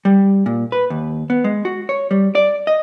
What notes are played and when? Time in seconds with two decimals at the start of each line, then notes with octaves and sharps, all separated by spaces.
0.05 G3
0.46 A#2
0.72 B4
0.90 D#2
1.30 B3
1.44 G#3
1.65 F#4
1.89 C#5
2.11 G3
2.35 D5
2.67 D#5